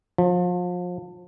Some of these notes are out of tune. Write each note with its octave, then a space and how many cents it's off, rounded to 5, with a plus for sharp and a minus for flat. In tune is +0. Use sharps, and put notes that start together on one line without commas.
F3 +35